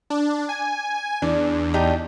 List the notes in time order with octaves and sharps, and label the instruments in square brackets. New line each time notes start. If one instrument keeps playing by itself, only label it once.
[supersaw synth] D4
G#5
[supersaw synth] E2 [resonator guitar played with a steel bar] D4
[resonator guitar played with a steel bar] D4 D#4 G4